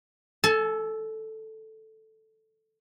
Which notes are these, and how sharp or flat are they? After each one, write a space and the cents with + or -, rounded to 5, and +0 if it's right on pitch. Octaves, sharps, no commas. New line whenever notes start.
A4 +0 G#5 +45